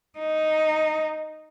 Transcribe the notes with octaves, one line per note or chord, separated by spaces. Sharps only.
D#4